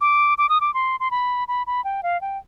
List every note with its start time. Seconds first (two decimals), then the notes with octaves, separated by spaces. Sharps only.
0.01 D6
0.38 D6
0.49 D#6
0.61 D6
0.74 C6
1.00 C6
1.11 B5
1.48 B5
1.67 B5
1.84 G5
2.03 F5
2.21 G5